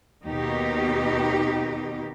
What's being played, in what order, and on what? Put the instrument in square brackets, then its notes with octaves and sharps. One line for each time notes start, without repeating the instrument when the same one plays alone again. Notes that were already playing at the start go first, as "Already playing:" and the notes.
[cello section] D#2 B2 D#4 G4